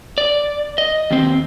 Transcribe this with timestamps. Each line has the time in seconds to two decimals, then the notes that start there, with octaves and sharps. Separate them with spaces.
0.18 D5
0.78 D#5
1.11 D#2 C4